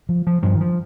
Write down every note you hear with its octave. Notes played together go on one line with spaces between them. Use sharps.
F3
F3
G2 F3
D#3
F3